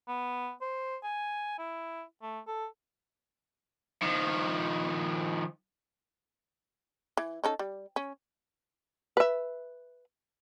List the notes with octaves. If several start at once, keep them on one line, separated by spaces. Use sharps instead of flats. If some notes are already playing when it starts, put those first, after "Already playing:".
B3
C5
G#5
E4
A3
A4
D#3 F3
E3
C#4 D#4 A4
G3
C#4
B4 E5